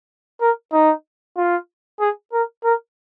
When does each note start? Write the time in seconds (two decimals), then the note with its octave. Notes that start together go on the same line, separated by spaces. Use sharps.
0.41 A#4
0.73 D#4
1.37 F4
2.00 G#4
2.32 A#4
2.64 A#4